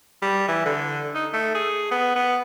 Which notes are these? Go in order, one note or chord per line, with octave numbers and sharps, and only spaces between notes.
G3
E3
D3
D#4
A3
G#4
B3
B3